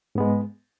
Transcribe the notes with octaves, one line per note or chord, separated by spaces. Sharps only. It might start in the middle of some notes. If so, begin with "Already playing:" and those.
G#2 G#3 B3